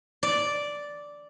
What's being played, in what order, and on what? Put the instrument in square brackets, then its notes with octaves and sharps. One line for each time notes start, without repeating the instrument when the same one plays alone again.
[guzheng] D5